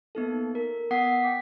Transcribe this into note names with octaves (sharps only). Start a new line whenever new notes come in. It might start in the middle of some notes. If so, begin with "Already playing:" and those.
A#3 B3 D#4 A4
A#4
B3 F#5 D#6 B6 C7
G5 D6 B6